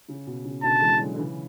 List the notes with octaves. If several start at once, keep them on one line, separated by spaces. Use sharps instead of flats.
C#3
B2
C#3
B2 D3 A5
E3 G#3
D3 F#3
D3
C#3 E3